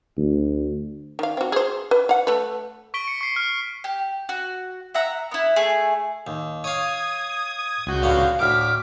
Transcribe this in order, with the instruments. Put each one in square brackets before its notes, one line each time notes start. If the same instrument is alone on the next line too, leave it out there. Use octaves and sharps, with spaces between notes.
[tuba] D2
[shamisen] D#3 F5
C4 F#4
G#4 C5
B4
F5 F#5
A3 B4
[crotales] C#6 B6 D7 G7
C#7
C#6 C7
F6
[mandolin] G4
F#4
E5 F#5 A#5 E6
B3 E4
A3 G#4
[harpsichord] D#2
[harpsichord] C#5 F5 [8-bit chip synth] D#6 G#6
[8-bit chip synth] C#2 F#4 G6
[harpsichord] D3 B3 C#4 [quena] F5
[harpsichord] D2 A2 [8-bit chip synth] D6 B6 [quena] F6